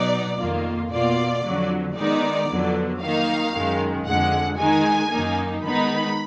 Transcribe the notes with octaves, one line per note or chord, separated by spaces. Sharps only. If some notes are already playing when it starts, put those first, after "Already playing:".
Already playing: B2 F#3 B3 D#4 D5
F2 D#3 A#3 F4
B2 A#3 F4 D5
F2 D3 F#3
D#3 G#3 B3 D#4 D5
F2 D3 F#3 B3
D#3 A#3 D#4 F5
F#2 D#3 G#3
F2 D3 G#3 F#5
D#3 G#3 D#4 G#5
F#2 D#3 A#3 D#4
D#3 G#3 B3 D#4 B5